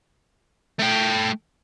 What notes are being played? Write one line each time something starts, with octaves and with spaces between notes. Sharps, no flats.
A3 G5